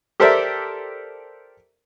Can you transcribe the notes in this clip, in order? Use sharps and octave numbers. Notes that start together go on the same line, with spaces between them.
G4 A4 A#4 C5 D5 E5